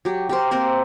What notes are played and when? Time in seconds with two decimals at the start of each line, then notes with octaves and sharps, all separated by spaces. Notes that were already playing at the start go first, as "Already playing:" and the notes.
0.05 F#3 G4
0.29 G4 A#4 C5
0.51 A#3 C4 A#4 C5